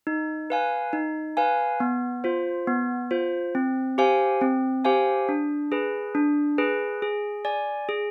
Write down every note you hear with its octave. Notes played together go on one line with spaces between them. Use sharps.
D#4
B4 F5 G#5
D#4
B4 F5 G#5
B3
F4 C5
B3
F4 C5
C4
G4 C5 F5 G#5
C4
G4 C5 F5 G#5
D4
G#4 B4
D4
G#4 B4
G#4
D5 G#5
G#4